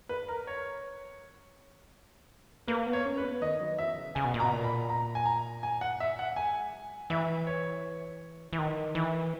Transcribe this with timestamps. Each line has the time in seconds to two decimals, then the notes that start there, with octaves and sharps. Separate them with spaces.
0.09 B4
0.28 A#4
0.47 C#5
2.68 A#3 B4
2.86 B3
2.93 C#5
3.06 C#4
3.18 B4
3.23 B3
3.42 D#3 D#5
3.61 F#3
3.79 E3 E5
3.97 C#3
4.15 C#3 G#5
4.25 B2
4.34 A#2
4.40 B2 A#5
4.52 A#2
4.64 B5
4.89 A#5
5.15 G#5
5.26 A#5
5.63 G#5
5.81 F#5
6.00 E5
6.19 F#5
6.36 G#3 G#5
6.73 F#3
7.10 E3 E5
7.47 C#5
8.53 E3
8.58 D#3
8.95 E3